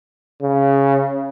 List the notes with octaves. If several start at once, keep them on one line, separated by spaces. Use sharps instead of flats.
C#3